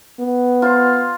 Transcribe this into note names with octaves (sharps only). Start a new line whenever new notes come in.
B3
F4 C5